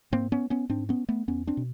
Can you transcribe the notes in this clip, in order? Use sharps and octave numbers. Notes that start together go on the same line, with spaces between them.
G#2 A#3 C4
B3 C#4
B3 C#4
G#2 C4 D4
B3 C#4
A3 B3
E2 B3 C#4
C4 D4
B2